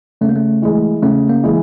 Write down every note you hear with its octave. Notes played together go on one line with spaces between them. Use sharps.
C#3 A3
A#3
A3
E3 G#3
C#3 A3
A#3
E3 G#3